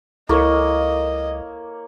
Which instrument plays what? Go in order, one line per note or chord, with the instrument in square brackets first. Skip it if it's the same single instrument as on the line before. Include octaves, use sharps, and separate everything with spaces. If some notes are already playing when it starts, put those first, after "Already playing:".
[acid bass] C#2 [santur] A#3 C#5 [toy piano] E4 A4 C#6 [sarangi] D#5